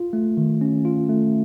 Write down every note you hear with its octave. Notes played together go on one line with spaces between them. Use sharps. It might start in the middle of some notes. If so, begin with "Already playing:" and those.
Already playing: F4
A3
D#3
C#4
F4
A3